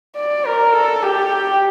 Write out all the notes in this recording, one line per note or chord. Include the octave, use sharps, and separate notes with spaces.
D5
A#4
A4
G4